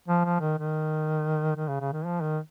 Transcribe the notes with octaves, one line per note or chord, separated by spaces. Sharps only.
F3
F3
D#3
D#3
D#3
C#3
C#3
D#3
F3
D#3